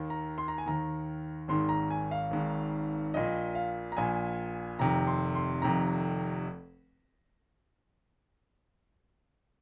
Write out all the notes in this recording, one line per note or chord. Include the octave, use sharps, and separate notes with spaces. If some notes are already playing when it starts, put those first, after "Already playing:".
Already playing: D#2 D#3
A#5
C6
A#5
G#5
D#2 D#3 A#5
G#1 G#2 D#3 C6
A#5
G#5
F5
G#1 G#2 D#3
A#1 A#2 D#5
F5
A#5
A#1 A#2 G#5
F1 F2 C3 D#3 A#5
C6
C6
F1 F2 C3 D#3 A#5